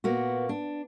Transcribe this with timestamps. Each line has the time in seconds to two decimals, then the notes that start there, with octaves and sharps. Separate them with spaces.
0.04 A#2 A#3 B3 F#4
0.49 D4